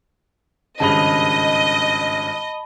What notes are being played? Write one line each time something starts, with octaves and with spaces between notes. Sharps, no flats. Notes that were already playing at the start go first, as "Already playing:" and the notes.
G#1 G2 C#3 D#5 A5 B5